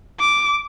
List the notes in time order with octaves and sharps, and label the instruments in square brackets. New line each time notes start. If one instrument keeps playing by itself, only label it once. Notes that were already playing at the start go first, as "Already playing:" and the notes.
[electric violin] D6